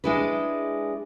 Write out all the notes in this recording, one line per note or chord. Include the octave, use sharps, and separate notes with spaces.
G#3 D4 E4 G#4 B4